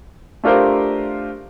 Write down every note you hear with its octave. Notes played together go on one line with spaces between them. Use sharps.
A3 D4 F4 G4 A#4 C5